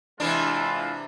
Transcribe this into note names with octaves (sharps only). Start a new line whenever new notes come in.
C3 E3 G#3 D4 E4 F4